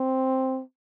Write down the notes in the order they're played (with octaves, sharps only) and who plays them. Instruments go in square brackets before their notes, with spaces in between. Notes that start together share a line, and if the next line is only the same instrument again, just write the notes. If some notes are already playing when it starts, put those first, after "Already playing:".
Already playing: [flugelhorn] C4